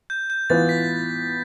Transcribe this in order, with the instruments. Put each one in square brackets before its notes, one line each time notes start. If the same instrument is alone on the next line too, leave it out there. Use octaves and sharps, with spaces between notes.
[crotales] G6
G6
[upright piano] E3 B3 F4 B4 [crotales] A6
[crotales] B6